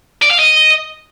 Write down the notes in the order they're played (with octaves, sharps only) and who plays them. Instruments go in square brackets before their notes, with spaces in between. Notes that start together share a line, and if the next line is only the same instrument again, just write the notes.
[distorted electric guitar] D5
F5
D#5